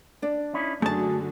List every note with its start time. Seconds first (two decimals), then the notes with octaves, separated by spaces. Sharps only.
0.22 D4 D5
0.53 C#4 D#4 E4
0.82 F#2 D3 A3 F#4 G#4 A5